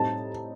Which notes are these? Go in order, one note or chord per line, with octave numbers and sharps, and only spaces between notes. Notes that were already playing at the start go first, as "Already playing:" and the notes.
Already playing: A2 G3 C4 D#4 A5